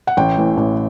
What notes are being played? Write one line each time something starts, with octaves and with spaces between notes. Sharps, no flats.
F#5
A1 G5
A2 E3
A1